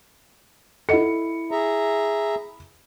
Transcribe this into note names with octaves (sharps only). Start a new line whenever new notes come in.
E4 A4 D#5 F#5 C#7
G#4 E5 A#5